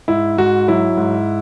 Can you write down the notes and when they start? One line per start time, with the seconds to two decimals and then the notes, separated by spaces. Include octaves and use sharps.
0.08 G#2 E4
0.37 G#2 F#4
0.68 F#3 E4
0.97 G#2